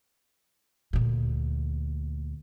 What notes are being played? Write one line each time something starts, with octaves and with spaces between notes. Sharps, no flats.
D2 A#2